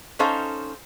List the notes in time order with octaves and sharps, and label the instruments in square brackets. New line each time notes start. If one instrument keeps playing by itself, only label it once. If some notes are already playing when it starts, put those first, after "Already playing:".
[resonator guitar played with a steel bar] C#4 D#4 A4 C5 C#5 F5